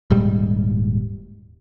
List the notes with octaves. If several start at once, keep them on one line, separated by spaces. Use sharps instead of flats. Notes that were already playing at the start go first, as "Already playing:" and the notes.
D#1 G#2 G3